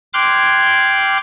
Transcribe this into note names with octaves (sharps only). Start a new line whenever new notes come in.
G5 C6 D6 F6 F#6 G#6